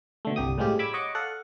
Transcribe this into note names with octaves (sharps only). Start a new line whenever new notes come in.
B2 D3 A3
G1 C2 G4 D#6
A2 G3 G#3 C4 F4 G4
B5 D6 E6 G#6
C#5 D#5 F#5 C#6 D6
A4 F5 F#5